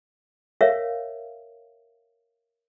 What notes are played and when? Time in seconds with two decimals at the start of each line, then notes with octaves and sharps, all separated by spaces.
0.61 A#4 C#5 E5 F5